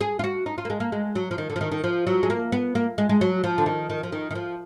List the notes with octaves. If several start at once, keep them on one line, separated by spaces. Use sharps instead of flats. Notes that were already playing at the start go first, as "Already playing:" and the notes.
G#4
F4
F#4
D#4
F4
A#3
G#3
A#3
G#3
F#3
F3
D#3
D3
F3
D#3
D#3
F3
F#3
G#3
A#3
B3
A#3
G#3
G#3
F#3
F3
D3
D#3
D#3
F3
D#3
D#3
F3